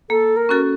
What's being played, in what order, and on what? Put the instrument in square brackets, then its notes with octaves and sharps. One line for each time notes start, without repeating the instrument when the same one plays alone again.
[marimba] A#3 [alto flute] A4
[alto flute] A#4
[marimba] C#4 F#4 A4